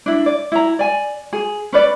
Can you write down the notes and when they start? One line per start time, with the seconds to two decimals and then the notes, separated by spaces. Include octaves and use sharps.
0.06 D4 E4
0.26 D5
0.52 E4 A#5
0.79 D5 G#5
1.33 G#4
1.73 C#4 B4 D5